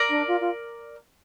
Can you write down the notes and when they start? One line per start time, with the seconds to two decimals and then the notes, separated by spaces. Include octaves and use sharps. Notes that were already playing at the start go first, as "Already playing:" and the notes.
Already playing: A#4 D5
0.09 D4
0.27 F4
0.40 F4